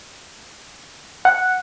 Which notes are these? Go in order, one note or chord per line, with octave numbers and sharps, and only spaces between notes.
F#5